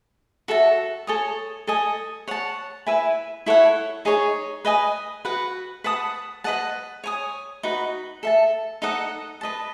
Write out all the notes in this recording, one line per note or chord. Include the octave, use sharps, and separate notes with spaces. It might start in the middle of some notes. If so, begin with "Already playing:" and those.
F#4 A4 E5 A5
A4 C#5 G#5 D#6
A4 D#5 G#5 D#6
C#5 F#5 A5
E4 B4 E5 G#5
E4 A4 C#5 F#5
D#4 G#4 C#5
B4 D#5 G#5 D#6
F#4 B4 F#5
B4 F#5 A5 D#6
B4 D#5 F#5 A5
C#5 G#5 D#6
D#4 F#4 B4
A4 E5 A5
D#4 A4 D#5 F#5
B4 D#5 A5